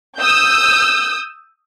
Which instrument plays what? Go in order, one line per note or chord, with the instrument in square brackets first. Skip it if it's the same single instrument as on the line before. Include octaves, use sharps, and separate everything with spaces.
[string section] D#6 E6 G6